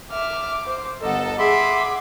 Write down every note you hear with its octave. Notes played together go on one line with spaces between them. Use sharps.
E5 D6 F6
C5
G1 A4 A#4 D#5 F#5
G#4 E5 F#5 B5 C6 D6